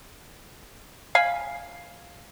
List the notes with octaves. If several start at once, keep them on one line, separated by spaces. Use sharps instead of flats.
F5 G#5 B5